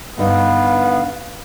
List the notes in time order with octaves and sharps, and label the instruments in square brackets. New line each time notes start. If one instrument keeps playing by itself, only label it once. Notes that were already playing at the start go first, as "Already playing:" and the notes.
[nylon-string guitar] G2 D3 D#4 [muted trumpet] B3 [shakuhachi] F5